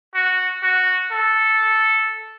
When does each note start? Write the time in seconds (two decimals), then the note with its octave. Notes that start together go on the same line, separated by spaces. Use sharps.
0.15 F#4
0.63 F#4
1.12 A4